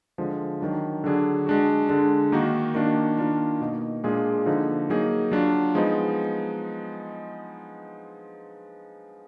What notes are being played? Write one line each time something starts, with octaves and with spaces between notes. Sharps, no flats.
D3 F3 G#3
D#3 F#3 D4
D3 F#3 D4 G#4
G#3 D4 F#4
D3 G#3 D4
D#3 A#3 D#4 F#4
D#3 A#3 D4 F#4
D#3 A#3 D4 F4
B2 A#3 D#4
A#2 G#3 D4 F4 G#4
D3 F3 A#3 D#4
F#3 A#3 D#4 G#4
F#3 D4 F4
F3 G#3 B3 D#4